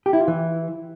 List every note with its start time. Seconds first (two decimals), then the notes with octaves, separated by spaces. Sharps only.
0.06 G4
0.13 E4
0.20 F4
0.28 E3